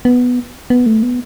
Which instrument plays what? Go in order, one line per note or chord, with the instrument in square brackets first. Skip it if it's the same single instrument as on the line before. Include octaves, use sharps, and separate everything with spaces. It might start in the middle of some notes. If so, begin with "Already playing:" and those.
[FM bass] B3
B3
A3
B3